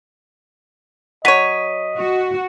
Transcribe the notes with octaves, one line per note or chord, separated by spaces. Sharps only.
F#3 C#5 D#5 B6 D#7
F#4